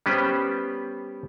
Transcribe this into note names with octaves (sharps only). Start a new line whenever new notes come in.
G3 B3 C#4 G4 B4 C5